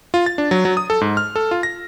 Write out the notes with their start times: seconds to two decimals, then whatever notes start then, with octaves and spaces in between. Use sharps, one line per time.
0.14 F4
0.26 A6
0.38 D4
0.51 F#3
0.65 F#3
0.77 D#6
0.90 A4
1.01 G#2
1.17 F6
1.36 A4
1.51 F4
1.63 A#6